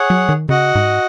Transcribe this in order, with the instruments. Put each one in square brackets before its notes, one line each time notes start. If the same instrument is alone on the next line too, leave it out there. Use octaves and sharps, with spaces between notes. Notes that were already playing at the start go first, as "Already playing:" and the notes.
Already playing: [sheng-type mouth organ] G#4 C#5 F#5
[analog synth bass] F#3
D#3
[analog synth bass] C#3 [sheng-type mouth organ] F#4 D#5 F#5
[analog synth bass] G#2